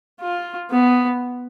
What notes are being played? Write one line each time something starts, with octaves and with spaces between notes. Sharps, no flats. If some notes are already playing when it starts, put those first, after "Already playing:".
F4
B3